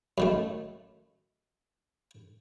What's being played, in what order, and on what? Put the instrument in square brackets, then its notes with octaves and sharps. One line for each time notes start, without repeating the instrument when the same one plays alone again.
[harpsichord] F#2 D#3 A3